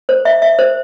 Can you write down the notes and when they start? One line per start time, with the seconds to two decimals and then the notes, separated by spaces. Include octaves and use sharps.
0.09 C5
0.25 E5
0.42 E5
0.59 C5